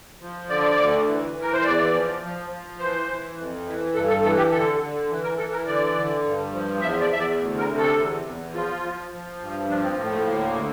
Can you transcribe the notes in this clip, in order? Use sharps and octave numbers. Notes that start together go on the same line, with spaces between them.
F3
D3 D5
D2
E3
E3
A#4
C5
E2 D5
F3
F3
F3
E3 C5
E3
F2
E3
G2 A4
A4
E3 A4
G4
D3 A4
D3
E3
A#4
E3 A4
A#4
D3 D5
D3
G2
F3
E2 E5
D5
E2 E5
D5
D2
A#4
C3
A4
E2
E2
F3 F4
F3
F3
G2
F3 D4
C4
A2 A#3
A3
D2 A#3
D3